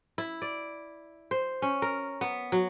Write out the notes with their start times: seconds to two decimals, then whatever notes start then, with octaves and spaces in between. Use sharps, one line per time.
0.18 E4
0.42 D5
1.31 C5
1.62 C#4
1.82 A#4
2.21 B3
2.52 F#3